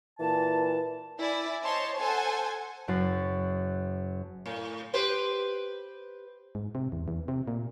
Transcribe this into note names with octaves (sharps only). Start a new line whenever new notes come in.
A#2 E3 A5
E4 D5 G#5
C5 C#5 D#5 A5 C6
A4 C5 F#5 G#5 A5
F#1 F#2 F#4 F#5 A6 C7
A2
G4 B4 C5
G#2
C3
E2
E2
C3
A#2